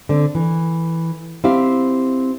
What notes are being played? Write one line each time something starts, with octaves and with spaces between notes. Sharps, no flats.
D3 C4
E3
C4 E4 G4 F5